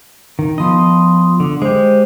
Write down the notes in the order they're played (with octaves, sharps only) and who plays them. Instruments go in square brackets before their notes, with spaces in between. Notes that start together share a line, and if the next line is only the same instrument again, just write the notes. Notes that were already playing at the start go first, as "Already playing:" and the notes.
[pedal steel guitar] D#3
[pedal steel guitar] F3 D#5 [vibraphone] B3 C6 D#6
[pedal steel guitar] D3
[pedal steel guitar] G#3 G4 [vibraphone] C5